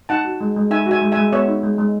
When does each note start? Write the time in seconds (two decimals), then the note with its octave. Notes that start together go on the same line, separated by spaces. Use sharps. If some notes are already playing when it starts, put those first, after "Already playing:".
0.09 D#4 F#5 A5
0.25 F#4
0.41 G#3
0.56 G#3
0.71 D#4 E5 G#5
0.86 F#4
0.91 E5 G#5
1.02 G#3
1.12 E5 G#5
1.17 G#3
1.32 B3 C#5 E5
1.48 D#4
1.63 G#3
1.78 G#3